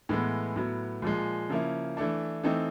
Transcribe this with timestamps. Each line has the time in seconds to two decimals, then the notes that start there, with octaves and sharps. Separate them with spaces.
0.09 A2 E3 G#3 B3
0.56 A2 F#3 B3
1.02 A#2 F3 G#3
1.49 C#3 F3 A#3 C#4 E4
1.97 E3 A3 D4
2.43 E3 A3 C4 D#4